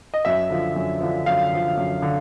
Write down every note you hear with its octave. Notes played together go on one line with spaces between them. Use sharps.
D#5
F#2 E5
D3 F3
F#2
D3 F3
F#2 F5
D3 F3
F#2
D3